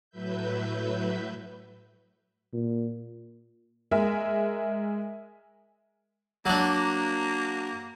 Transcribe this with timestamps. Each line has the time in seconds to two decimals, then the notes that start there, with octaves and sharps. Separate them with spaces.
0.10 A2 F#3 B4 E5 G6
2.53 A#2
3.91 G#3 A#4 E5
6.46 F#3 A#3 D4